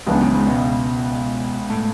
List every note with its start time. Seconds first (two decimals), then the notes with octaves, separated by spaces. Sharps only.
0.07 C#2 F#2 C#3 E3 B3 D4
0.21 F#2
0.34 G#2
0.47 B2
1.70 A2